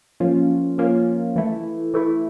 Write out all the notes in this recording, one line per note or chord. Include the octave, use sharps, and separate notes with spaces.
F3 A#3 C#4 F4
F3 A#3 C#4 F4
E3 A3 E4
E3 A3 E4